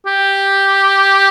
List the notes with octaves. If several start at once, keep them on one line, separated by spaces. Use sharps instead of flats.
G4